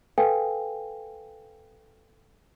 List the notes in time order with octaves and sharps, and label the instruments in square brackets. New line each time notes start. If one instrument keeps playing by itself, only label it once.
[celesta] A4 B4 F5 G5 G#5